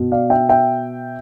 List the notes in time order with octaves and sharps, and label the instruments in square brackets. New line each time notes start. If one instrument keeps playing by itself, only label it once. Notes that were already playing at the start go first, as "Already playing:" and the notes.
Already playing: [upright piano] B2
D5 F5
E5 G5
E5 G5